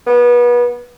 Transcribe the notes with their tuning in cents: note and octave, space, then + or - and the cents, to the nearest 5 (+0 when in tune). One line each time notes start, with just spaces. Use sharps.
B3 -30